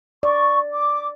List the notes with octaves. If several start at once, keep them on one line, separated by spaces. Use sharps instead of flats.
D5 C#6
D6